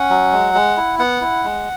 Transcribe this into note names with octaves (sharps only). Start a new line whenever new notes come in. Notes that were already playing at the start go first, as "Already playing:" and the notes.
Already playing: C#4 F#5
F#3
G#3
G#3
E4
B3 F#5
E4
G#3